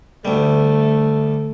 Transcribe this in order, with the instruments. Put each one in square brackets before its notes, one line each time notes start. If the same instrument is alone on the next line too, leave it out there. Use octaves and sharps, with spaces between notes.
[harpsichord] D2 G3 [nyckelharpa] A3